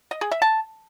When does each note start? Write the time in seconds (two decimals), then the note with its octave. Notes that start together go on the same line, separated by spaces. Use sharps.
0.11 D#5
0.21 G#4
0.31 E5
0.42 A5